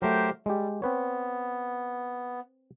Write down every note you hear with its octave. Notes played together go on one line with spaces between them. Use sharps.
F#3 A3 G4 A#4 C5
G3 G#3 G4
B3 C4 B4 C#5